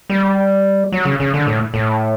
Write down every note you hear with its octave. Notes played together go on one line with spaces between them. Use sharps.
G3
F#3
C#3
C#3
D3
A2
A2